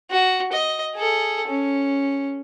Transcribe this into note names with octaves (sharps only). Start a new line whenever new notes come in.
F#4
D#5
G#4 A4
C#4